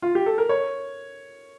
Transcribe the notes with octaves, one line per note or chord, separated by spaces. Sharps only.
F4
G4
A4
A#4
C#5